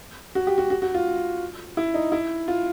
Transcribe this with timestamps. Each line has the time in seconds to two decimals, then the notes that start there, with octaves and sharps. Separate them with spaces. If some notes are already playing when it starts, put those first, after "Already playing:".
0.35 F#4
0.47 G4
0.58 F#4
0.70 F#4
0.82 F#4
0.94 F4
1.77 E4
1.94 D#4
2.12 E4
2.48 F4